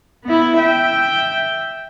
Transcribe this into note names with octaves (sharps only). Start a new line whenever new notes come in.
B3 E4
E5 G5